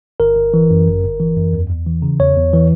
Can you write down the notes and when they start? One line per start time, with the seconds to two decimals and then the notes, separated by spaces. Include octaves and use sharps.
0.20 G1 A#4
0.37 G1
0.54 E3
0.71 F#2
0.87 G1
1.03 G1
1.20 E3
1.37 F#2
1.53 E2
1.70 E2
1.87 E3
2.02 C#3
2.20 E2 C#5
2.37 E2
2.53 E3